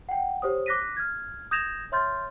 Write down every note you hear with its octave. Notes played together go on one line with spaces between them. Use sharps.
F#5 G5
G4 C5 C#5 D#6
D6 F#6 A#6 B6 D#7
F6 G#6
D#6 G6 G#6 A#6 E7 F7
C#5 E5 C6 F6 G6 A6